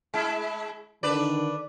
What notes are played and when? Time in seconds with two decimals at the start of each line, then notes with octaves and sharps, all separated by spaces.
0.14 G#3 E4
1.03 D3 D#3 D4 B4 D5